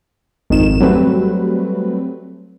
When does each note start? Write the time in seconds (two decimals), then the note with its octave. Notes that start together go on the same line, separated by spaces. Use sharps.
0.50 G#1 F2 D#3 E7
0.80 F#3 G3 A3 C4 B4